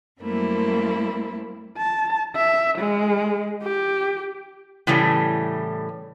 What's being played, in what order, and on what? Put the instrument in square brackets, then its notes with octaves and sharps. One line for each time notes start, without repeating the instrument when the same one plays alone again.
[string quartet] F#2 G3 A3 A#3 C4 E4
[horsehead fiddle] A5
E5
G#3
G4
[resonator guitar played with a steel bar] A2 C#3 E3 G3 A3